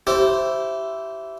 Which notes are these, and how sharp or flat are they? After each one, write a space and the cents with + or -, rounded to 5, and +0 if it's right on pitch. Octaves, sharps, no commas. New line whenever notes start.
E4 +5 G4 -25 C5 +0